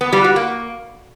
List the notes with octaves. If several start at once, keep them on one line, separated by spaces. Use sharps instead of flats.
B3
G3
F#4
A#3